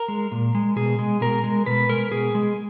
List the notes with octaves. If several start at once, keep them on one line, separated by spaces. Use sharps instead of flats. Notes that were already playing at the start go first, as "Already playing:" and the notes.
Already playing: A#4
G#3
A#2
G#3
B2 G#4
G#3
B2 A#4
G#3
B2 B4
G#3 A#4
B2 G#4
G#3